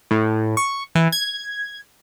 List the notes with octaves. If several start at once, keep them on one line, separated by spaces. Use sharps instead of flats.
A2
C#6
E3
G#6